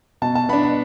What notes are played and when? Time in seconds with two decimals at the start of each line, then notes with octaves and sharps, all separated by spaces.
0.22 B2 A5
0.35 A5
0.49 B3 D4 B5
0.63 B5